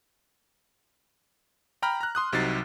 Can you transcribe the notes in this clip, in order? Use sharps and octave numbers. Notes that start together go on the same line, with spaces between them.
G5 A#5 B5 F6
A#5 F#6
C6 D#6 F#6
C2 C3 F#3 D#4 A6 C7